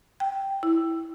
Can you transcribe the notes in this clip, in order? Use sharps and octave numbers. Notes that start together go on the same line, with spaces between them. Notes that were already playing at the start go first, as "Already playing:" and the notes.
G5
E4